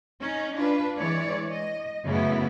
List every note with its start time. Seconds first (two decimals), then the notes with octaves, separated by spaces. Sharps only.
0.20 C#4 D#4
0.57 D4 F4 B4
0.98 E3 G#3 C#5 D5
1.51 D#5
2.04 F#2 A2 C#3 B3 E4